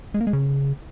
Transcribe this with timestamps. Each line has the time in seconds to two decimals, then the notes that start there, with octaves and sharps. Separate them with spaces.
0.14 G#3
0.21 A#3
0.27 G#3
0.33 C#3